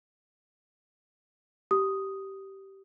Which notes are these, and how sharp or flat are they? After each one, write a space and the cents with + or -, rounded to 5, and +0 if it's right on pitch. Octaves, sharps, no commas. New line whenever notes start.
G4 -15 D#6 +0